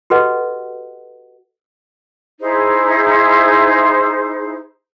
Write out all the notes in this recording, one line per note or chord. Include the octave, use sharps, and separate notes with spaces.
F#4 G4 A4 B4 D#5 F#5
D#4 E4 G#4 C5